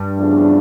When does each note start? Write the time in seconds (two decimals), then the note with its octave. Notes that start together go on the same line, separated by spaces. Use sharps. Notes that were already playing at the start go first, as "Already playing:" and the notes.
Already playing: G2
0.19 E2 C#3 F3 A3 D4